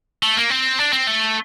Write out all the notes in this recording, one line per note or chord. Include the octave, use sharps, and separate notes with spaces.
A3
A#3
C4
D4
C4
A3